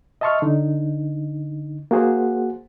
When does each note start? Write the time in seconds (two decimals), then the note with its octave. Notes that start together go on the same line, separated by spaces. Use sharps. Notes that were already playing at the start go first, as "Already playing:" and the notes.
0.21 D#5 E5 A5 C6 C#6 F6
0.42 D3 D#4
1.91 A#3 F#4 G#4 C5 F#5